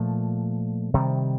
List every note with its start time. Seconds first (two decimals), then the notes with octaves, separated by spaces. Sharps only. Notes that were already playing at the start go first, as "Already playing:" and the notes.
Already playing: A#2 F3 A3
0.94 C3 D#3 G3